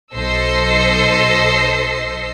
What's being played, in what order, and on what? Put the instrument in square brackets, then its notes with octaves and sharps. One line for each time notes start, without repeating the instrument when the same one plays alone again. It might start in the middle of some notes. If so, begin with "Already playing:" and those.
[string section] B1 A4 C5 D#5 E6 C7